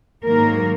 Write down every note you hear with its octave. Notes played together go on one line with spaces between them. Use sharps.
G#2 D#3 F#3 A#3 A#4